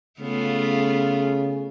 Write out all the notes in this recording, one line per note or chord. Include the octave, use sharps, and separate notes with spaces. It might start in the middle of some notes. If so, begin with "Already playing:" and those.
C#3 A3 B3 F4